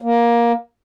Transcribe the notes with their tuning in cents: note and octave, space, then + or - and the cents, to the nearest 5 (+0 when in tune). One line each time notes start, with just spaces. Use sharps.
A#3 +15